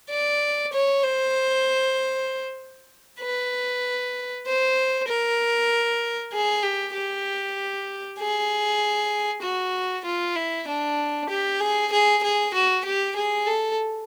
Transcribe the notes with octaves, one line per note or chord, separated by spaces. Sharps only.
D5
C#5
C5
B4
C5
A#4
G#4
G4
G4
G#4
F#4
F4
E4
D4
G4
G#4
G#4
G#4
F#4
G4
G#4
A4